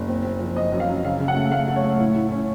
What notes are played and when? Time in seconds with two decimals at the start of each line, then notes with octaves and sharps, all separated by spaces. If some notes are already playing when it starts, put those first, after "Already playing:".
Already playing: F#1
0.08 C4
0.24 C4
0.40 F3
0.56 C4 D#5
0.72 F#2
0.80 F5
0.89 F#2
1.04 C#3 F5
1.20 C#3
1.28 F#5
1.36 A3
1.51 A3 F5
1.68 A3
1.76 C#5
1.83 A3
1.99 A2
2.16 A2
2.32 C#4